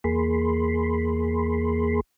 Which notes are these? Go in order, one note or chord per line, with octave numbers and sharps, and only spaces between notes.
E2 A#3 G#4 B5 C6